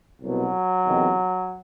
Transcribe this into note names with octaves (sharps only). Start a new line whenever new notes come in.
C2 B2 F#3
E2 C3 D#3